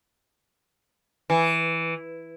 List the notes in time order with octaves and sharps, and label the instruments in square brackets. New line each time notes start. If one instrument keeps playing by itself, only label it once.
[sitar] E3